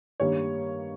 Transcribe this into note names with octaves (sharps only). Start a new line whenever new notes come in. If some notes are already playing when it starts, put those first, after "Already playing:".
G2 D#3 G3 A#3 C#5